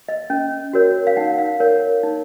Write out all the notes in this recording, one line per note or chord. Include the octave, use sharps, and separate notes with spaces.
D#5
C#4
F#4 A#4 C#5
F5
D#4 F#5
F5
A#4 C#5
D#4